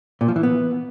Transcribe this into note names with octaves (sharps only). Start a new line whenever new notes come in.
A#2
F3
E3
B3